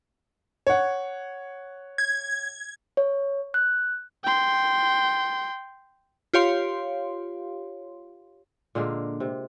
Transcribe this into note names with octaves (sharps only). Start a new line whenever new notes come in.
C#5 F#5
G#6
C#5
F#6
G5 C6
F4 G4 C#5 F5 C6
A#2 D3 G#3 A#3
C3